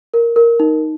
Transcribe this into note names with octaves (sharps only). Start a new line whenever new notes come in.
A#4
A#4
D#4